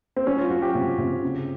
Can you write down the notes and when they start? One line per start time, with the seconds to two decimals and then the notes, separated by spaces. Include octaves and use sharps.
0.16 C4
0.26 F#3 C#4
0.38 F4
0.50 F#3 F#4
0.62 G4
0.75 C3
0.98 C3
1.23 C#3